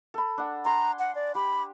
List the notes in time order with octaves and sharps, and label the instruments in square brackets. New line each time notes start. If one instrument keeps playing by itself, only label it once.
[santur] A4 B5
D4 F#5
[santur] G#5 C6 [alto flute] A#5
[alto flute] F#5
D5
[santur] G4 [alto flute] B5